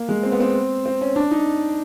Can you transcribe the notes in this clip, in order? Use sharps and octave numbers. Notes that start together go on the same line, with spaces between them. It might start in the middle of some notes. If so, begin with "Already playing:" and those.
Already playing: A#3
G#3
C4
B3
C4
C4
C#4
D4
D#4